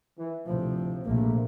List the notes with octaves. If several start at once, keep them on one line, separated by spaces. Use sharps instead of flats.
E3
D2 A2 C3 F3
A#1 C3 A3 A#3